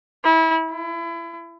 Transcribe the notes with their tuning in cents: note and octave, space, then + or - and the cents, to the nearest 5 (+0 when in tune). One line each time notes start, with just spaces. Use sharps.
E4 -25
E4 +30